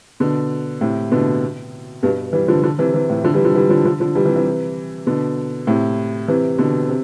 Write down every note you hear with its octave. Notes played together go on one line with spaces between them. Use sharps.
B2 D3
A2 C3
B2 D3
G2 B2
E3 G3
D3 F3
D3 F3
C3 E3
C3 E3
A2
D3 F3
E3 G3
D3 F3
E3 G3
D3 F3
D3 F3
D3 F3
E3 G3
C3 E3
C3 E3
B2 D3
A2 C3
C3 E3
B2 D3
C3